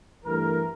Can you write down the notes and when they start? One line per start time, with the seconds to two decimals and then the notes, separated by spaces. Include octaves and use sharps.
0.25 G2 E3 A3 A#4